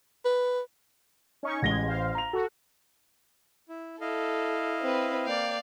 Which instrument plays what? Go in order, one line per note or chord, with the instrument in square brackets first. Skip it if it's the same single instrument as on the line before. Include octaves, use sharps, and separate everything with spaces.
[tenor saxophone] B4
[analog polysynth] C#4 D#4 C#6
[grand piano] A1 A#6 G7 [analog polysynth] G#3 G#6
[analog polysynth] C5 F5
[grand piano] A#5 F7
[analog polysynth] F#4 [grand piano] A4
[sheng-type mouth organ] E4
[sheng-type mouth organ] E4 D#5 F5 [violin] A4
[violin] C4 B4
[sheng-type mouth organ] A#3 G5 [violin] D5 F5